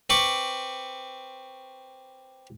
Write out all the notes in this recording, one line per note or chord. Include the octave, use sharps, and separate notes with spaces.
C4 B4 C#6 D6